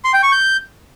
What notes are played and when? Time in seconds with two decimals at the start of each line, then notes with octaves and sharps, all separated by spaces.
0.05 C6
0.14 G5
0.23 C#6
0.32 G6